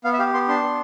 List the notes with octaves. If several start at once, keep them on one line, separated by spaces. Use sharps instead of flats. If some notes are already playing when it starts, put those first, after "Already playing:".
B3 F5
E5
G4 F5
B3 C6
D4 C6
B3